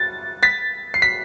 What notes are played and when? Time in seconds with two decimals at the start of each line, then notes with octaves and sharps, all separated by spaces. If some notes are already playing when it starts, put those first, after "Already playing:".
Already playing: A6
0.43 A6 B6
0.94 C7
1.02 B6